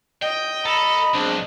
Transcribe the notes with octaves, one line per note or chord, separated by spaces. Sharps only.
D#5 G5
A4 A#5 B5
B1 G#3 C4 D4